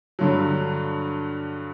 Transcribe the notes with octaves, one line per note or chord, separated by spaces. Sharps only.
G2 D3 F#3